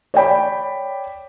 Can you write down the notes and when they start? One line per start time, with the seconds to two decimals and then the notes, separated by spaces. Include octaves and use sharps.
0.14 C#5 D5 G5 B5